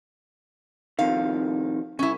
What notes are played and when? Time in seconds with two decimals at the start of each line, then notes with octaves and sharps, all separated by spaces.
0.99 F2 C3 D#3 F5
1.99 C2 C#4 E4